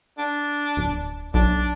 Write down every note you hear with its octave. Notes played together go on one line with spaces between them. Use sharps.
D4
D1
B1 D4